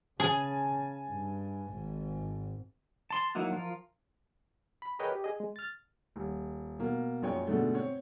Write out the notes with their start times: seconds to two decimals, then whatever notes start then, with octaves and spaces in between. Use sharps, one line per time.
0.20 C#3 G#4 G#5 A5
1.09 G2
1.70 G#1 G#2
3.11 A5 C6
3.35 F#3 A#3 D#4 E4 F#4
3.52 F3 F4 A#4
4.82 B5
4.99 G#4 A#4 B4 C#5 D#5 G5
5.12 G4
5.24 G#4 D#5
5.40 G#3
5.56 F6 A6
6.16 D#1
6.79 B2 A#3
7.22 A#1 F#2 G#3 G#4 C#5 G5
7.47 G#2 B2 D3 A3
7.74 C4 C#5